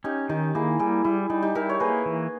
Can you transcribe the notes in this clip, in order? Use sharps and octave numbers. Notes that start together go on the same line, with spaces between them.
C#4 D#4 G4
D#3 D#4 G4
A#3 E4 G#4
G3 E4 G#4
G3 E4
G3 D#4
D#4 G4
E4 G4 A#4
C#5
A#3 G#4 B4
E3